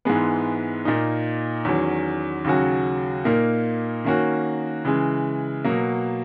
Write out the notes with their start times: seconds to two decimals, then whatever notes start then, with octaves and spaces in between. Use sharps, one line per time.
0.05 G#2 E3 G#3 B3
0.85 A#2 A#3 D#4
1.65 E2 D#3 F#3 C#4
2.44 D#2 C#3 F#3 C#4 F#4
3.24 A#2 A#3 D#4 A#4
4.05 D#3 A#3 C#4 F#4
4.85 C#3 E3 G#3
5.64 B2 F#3 A#3